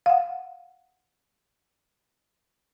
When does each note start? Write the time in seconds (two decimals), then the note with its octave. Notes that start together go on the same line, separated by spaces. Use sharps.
0.06 F5 F#5